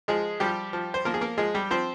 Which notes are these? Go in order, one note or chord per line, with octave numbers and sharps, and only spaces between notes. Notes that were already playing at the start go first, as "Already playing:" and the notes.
F3 G#3 G#4
F3 G3 G4
F3
C5
F3 A#3 A#4
G#4
A#3 A#4
F3 G#3 G#4
G3 G4
F3 C4 C5